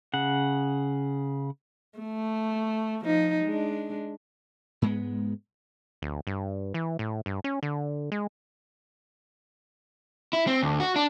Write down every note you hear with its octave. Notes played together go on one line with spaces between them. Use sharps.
C#3 F#5
A3
F3 D#4
G#3 D4
G#2 G#3 B3
D2
G2
E3
A2
G2
C#4
D3
G#3
E4
C4
D2
F#4
D4